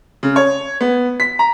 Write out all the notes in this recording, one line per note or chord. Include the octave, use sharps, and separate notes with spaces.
C#3
C#5
B3
B6
A#5